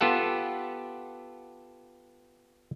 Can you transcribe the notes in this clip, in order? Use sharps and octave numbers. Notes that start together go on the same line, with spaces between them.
B3 F4 G4 A4 F#5